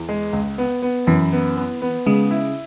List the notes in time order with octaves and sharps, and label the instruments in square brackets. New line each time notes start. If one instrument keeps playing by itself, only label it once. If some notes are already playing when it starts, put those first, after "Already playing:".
Already playing: [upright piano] E2
G#3
C#2
B3
B3
[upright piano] F#2 [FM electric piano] E3
[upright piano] B3
B3
B3
[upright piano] C#3 [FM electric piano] G#3
[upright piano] E4